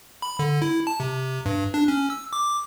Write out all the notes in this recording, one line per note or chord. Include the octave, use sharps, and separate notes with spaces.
B5
D3
E4
A5
C3
G2
D4
C#4
E6
D6